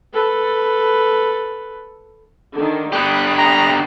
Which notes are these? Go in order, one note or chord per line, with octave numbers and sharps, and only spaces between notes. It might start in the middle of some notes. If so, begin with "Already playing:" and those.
A4 B4
D3 D#3
D3 G4 B5 D#6 F#6
A#5